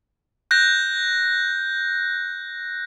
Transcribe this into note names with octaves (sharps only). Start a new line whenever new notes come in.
F#6 G6 A#6